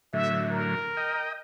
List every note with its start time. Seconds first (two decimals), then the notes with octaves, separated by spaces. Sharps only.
0.13 A2 D3 F#3 E5
0.51 A#4
0.97 D#5 G5